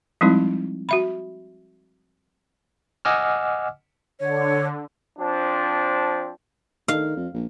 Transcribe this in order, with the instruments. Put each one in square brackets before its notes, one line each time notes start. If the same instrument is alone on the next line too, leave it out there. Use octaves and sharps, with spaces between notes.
[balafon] F3 G3 G#3 C4 D#4 E4
F#4 E5 B5
[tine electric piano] D#5 F#5 G#5 D6 E6 F6
[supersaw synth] D3 [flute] C#5
[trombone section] F3 C4 D4
[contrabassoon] D#3 [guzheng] F5
[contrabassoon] F2
A#1